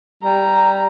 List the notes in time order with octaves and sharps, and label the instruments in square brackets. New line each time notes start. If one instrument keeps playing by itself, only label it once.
[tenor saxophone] G3 [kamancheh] A#5